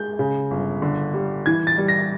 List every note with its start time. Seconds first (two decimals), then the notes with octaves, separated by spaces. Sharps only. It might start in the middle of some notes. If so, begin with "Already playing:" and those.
Already playing: G#3 G6
0.19 C#3
0.51 G1
0.82 D3
1.14 G3
1.46 E3 G#6
1.67 A6
1.78 G3
1.88 A#6